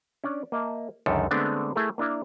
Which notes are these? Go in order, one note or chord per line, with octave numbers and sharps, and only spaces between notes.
C#4 D4 D5
A#3 D#5 E5 A5
C#2 F#2 D3 D#3 A4
D3 G#3 A3 B3 C4 D4
A3 E4 G#4 A#4
A#3 D4 E4 A#4